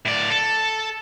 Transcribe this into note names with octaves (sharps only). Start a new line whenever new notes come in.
A2 D5
A4